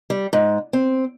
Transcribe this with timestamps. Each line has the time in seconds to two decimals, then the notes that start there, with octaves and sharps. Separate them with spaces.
0.10 G3
0.33 G#2
0.73 C4